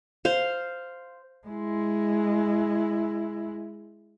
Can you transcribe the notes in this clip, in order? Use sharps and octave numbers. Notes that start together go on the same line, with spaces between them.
C5 F5
G#3 E4